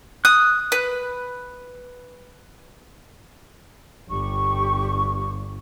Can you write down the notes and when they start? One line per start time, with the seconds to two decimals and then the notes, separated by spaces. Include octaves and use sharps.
0.25 D#6 F#6
0.72 B4
4.09 G1 G4 C#6